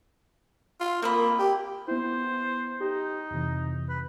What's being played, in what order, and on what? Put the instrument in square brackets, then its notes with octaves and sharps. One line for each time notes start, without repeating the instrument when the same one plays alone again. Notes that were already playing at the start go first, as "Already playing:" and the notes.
[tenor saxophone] F4
[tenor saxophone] A#3 [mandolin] C4 D#5 B5
[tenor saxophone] G4
[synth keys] B3 E4 [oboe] C5
[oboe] D#4 [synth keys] G4
[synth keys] F2 C3 E3
[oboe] B4